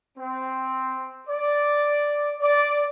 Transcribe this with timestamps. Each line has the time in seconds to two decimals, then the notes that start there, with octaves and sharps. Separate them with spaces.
0.17 C4
1.29 D5
2.41 D5